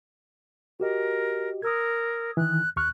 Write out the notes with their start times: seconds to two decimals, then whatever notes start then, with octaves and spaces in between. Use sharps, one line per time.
0.80 F#4 G4 A#4 D#5
1.62 A#4 D#6 E6 G#6
2.37 D#3 E3 F#6
2.76 D#2 C#6 F6 F#6